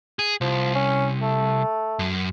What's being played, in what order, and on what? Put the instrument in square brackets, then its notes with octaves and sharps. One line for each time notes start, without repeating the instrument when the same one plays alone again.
[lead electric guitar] G#4
[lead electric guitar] C2 [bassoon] F3
[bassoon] C#4
A3
[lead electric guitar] F#2